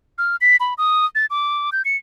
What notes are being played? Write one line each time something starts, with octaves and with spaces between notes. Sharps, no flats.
F6
B6
B5
D#6
A6
D6
G6
C#7